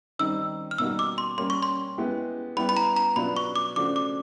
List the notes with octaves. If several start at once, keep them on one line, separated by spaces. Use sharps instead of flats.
D#3 G3 C4 D#4 E6
F6
B2 G3 A#3 D#4 F#4 E6
D6
C6
G3 A#3 C#4 C6
C#6
C6
G#3 B3 E4 G4
G3 B3 E4 G4 B5
B5
A#5
A#5
B2 F#3 B3 D4 F4 B5
C#6
D6
C#3 F3 A3 D4 F#4 D6
D6